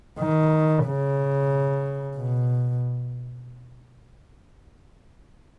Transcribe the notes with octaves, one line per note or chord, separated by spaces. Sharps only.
D#3
C#3
B2